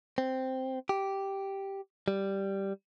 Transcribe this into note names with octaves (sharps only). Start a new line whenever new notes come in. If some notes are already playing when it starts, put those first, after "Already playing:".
C4
G4
G3